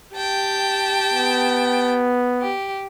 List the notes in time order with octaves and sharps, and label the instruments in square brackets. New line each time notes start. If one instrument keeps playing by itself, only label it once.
[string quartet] G4 G5 A5
[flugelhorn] B3
[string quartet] G4